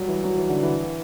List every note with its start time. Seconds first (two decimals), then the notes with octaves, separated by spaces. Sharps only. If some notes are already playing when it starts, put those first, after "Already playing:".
Already playing: F#3 G3
0.08 E3
0.24 F#3
0.37 E3
0.49 D3
0.63 E3